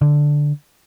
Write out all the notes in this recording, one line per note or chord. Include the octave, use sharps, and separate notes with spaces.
D3